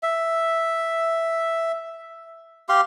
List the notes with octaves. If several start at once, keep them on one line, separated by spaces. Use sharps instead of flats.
E5
G4 F5 C6